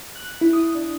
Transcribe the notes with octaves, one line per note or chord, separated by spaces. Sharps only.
F#6
E4
D#6
D4